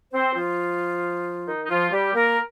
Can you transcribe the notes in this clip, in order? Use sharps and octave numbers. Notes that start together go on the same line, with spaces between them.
C4 C5
F3 F4
D#3 D#4
D#4
F3 F4
G3 G4
A#3 A#4